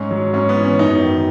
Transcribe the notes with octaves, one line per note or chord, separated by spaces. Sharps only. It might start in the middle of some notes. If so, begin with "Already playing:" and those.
Already playing: G#2 C#4
F#3
G#2 C#4
B3
E3
C#4
F#2 B3 D#4
D#3 F#3